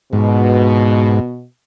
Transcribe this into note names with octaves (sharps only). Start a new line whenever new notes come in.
G#2 B2